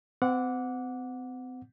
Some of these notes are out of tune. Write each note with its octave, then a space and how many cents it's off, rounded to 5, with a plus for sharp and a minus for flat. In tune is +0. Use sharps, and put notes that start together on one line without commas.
C4 -40 F#5 -15 D6 -15